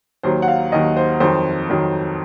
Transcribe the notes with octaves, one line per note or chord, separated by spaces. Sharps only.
D#2 D#3 F#3 C5
F#5
F5
D#2 D#3 F#3 D#5
C5
F2 D#3 F#3 C5
F2 D#3 F#3